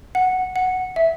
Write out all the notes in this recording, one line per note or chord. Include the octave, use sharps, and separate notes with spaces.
F#5
F#5
E5